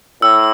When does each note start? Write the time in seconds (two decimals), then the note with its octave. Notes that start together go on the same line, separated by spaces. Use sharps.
0.22 A2 E6